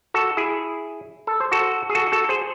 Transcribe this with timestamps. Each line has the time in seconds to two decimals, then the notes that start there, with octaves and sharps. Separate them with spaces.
0.14 F#4 A4
0.37 E4 G#4
1.27 A4
1.40 C5
1.52 F#4 A4
1.89 G#4
1.95 F#4 A4
2.12 F#4 A4
2.29 G#4 C5